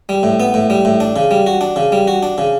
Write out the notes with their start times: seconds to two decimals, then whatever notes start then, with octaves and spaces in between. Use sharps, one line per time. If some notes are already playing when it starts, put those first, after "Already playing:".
0.09 G3
0.23 A2
0.40 B3
0.54 A2
0.70 G3
0.85 A2
1.00 D4
1.16 C#3
1.31 G3
1.46 F#4
1.61 D4
1.76 C#3
1.92 G3
2.08 F#4
2.23 D4
2.38 C#3